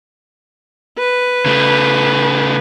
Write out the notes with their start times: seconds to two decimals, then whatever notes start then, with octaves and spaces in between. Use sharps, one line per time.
0.99 B4
1.46 C#3 A3